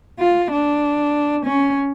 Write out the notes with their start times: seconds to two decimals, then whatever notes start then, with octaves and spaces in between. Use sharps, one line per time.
0.19 F4
0.51 D4
1.45 C#4